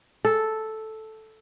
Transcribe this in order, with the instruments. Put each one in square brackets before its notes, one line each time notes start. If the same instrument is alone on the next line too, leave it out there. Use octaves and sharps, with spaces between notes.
[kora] A4